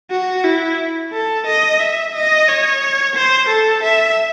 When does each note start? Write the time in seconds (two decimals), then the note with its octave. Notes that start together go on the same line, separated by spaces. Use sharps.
0.11 F#4
0.44 E4
1.13 A4
1.47 D#5
1.80 E5
2.15 D#5
2.48 C#5
3.16 C5
3.49 A4
3.83 E5